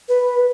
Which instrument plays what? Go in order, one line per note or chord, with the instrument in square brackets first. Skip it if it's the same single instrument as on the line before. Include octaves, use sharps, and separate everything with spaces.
[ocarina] B4